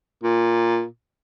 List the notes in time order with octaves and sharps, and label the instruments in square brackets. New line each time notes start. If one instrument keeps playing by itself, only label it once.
[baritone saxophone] A#2